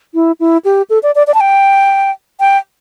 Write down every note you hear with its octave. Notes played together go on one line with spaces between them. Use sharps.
E4
E4
G4
A4
D5
D5
D5
A5
G5
G5